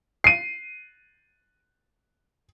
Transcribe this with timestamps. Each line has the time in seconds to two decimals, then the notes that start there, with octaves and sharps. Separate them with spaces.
0.24 C7 D#7